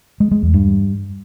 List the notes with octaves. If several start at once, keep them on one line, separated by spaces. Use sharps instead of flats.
G#3
G#3
E2
G2